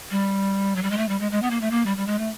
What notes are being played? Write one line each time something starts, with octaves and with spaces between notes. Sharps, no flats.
G3
F#3
G3
G#3
A3
G3
G#3
G#3
B3
A#3
A3
A#3
G3
G3
G#3
A3